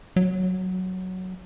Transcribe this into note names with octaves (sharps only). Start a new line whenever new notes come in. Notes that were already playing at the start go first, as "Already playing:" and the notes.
F#3